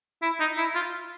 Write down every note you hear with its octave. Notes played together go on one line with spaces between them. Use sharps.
E4
D#4
E4
F4